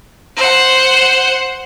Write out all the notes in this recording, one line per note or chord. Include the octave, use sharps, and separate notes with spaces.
C5 F#5